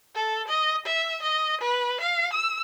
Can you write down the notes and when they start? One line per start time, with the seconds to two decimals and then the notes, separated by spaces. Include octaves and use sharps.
0.15 A4
0.48 D#5
0.86 E5
1.22 D#5
1.61 B4
2.00 F5
2.33 E6